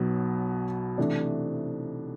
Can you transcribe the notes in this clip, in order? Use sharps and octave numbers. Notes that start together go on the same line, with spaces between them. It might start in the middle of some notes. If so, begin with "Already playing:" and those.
Already playing: B1 B2 F#3 B3
C3 E3 A3 D4